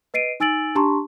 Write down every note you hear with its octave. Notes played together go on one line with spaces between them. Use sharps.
B4 D#5 C7 D7 D#7
D#4 G#5 E6 A6 D7 F#7
D4 G4 A5 A#5 C6 C#6